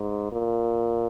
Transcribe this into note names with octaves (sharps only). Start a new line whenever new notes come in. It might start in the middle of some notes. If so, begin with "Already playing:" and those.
Already playing: G#2
A#2